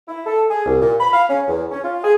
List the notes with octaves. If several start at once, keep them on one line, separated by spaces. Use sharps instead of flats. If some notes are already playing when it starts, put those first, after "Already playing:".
E4
A4
G#4
C2
A#2
B5
F5
C#4
E2
C#4
F4
G#4